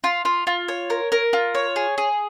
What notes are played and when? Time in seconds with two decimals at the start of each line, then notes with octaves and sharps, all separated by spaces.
0.04 F4
0.25 F4
0.47 F4
0.68 C#5
0.90 A#4
1.12 A#4
1.33 F4
1.55 C#5
1.76 G#4
1.98 G#4